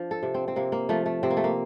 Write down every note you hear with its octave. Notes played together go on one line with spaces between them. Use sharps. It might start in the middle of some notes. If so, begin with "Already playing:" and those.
Already playing: F3 D4
A4
C3
C4
C4
C3 A#3
A#3
F3 A3
A3
C3 C4
A#3
A3
A#3